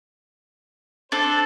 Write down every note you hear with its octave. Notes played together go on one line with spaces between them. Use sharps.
D4 A4 C5